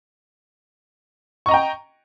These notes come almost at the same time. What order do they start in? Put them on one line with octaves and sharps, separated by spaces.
C#6 D#5 A#5 G5